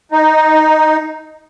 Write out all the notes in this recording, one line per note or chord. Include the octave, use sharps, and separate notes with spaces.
D#4